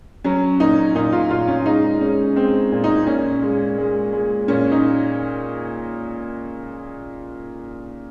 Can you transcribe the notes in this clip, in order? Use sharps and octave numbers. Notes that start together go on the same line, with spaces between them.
F#3 C#4
A#2 D#4
A#2 D#4
F4
A#2 F4
C#4
G#3 D#4
G#3 C#4
G#3 C4
A#2
D#4
A#2 C#4
G#3
G#3
G#3
A#2 C#4
D#4